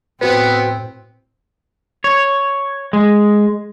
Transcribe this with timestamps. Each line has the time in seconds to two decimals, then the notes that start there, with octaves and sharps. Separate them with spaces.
0.21 A2 B3 C4 F#4 B4
2.04 C#5
2.93 G#3